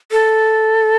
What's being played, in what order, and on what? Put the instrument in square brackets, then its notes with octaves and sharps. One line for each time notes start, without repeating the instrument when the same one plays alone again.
[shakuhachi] A4